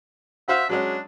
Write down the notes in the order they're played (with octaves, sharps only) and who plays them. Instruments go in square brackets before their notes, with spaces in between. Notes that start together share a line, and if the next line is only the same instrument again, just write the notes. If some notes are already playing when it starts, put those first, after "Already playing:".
[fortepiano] F#4 C5 F5 [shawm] E5
[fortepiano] F#3 G#3 C#4 [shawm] D4